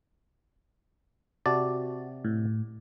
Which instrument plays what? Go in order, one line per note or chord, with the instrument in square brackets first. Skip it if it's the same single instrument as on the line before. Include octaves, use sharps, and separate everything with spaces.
[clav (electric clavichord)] C3 D5 A5 [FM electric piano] F#4
[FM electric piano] A2